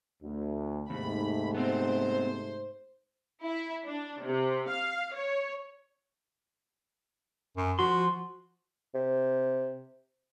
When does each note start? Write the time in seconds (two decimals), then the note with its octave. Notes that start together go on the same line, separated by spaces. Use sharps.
0.23 D2
0.90 D#2 G#2 C3 A3 B5
1.55 B3 C4 C5
3.42 E4
3.86 D4
4.24 C3
4.70 F5
5.15 C#5
7.57 F#2
7.79 F3 F#4 C6
8.95 C3